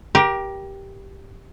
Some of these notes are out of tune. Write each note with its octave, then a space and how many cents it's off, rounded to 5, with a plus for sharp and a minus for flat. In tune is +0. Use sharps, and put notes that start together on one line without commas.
G4 +0 A#4 +30